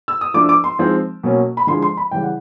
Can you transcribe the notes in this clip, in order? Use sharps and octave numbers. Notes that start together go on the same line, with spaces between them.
E6
D#6
F3 A3 D4 D6
D6
C6
F3 G#3 C4 D#4
B2 F#3 A#3 C#4
B5
D3 F3 G#3 C6
C6
B5
C#3 E3 G3 G5
F#5